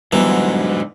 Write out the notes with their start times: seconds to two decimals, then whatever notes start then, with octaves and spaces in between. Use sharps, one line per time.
0.13 G#2 D3 E3 F#3 G3 B3